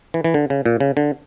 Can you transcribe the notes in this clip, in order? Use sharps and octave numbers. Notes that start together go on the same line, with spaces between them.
E3
E3
D3
C#3
A#2
C#3
D3